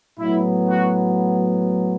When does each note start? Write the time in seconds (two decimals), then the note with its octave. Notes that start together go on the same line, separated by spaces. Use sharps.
0.19 A2 F#3 B3 E4
0.69 F#4